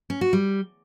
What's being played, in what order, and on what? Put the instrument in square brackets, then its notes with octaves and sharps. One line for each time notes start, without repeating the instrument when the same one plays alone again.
[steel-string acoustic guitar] C#4
F#4
G3